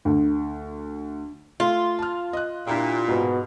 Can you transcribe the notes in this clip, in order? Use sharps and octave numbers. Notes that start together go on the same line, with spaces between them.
D2
A3 F4
A5 F6
D#5 F#6
A#2 D4 E4 G4
G#2 B2